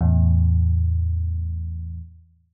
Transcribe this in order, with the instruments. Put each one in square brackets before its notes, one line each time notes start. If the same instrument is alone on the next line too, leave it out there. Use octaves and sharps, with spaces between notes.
[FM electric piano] E2 A2